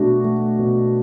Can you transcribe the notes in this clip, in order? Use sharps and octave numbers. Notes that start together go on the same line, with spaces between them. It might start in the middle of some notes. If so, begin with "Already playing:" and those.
Already playing: B2 A3 D4 F#4
A3
B2